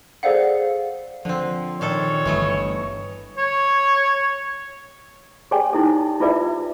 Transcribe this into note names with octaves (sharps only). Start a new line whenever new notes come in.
G#4 A4 C5 D5 F5 F#5
D3 F3 C4
A#2 D#3 A4 C#5
G1 E3 A3 D#5
C#5
G4 G#4 C#5 D5 G5 G#5
D#4 E4 A4
E4 F4 G#4 B4 D5 E5